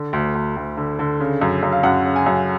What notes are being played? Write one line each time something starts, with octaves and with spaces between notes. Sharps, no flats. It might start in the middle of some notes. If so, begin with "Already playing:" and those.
Already playing: D3
D2
D2
D2
D3
D3
C#3
F#2
F#2
F5
F#2 F#5
C#3
G#5
F#2